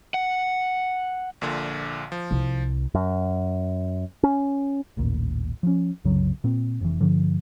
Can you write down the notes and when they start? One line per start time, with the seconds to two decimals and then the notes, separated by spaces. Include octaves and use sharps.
0.14 F#5
1.41 A#1 A#2 D3
2.12 F3
2.31 C2
2.94 F#2
4.23 C#4
4.97 A1 D#2 A#2
5.63 F3 C#4
6.05 C2 F#2 C#3 F#3
6.44 A#2 C4
6.81 F1 E3
7.00 G2 D3 F3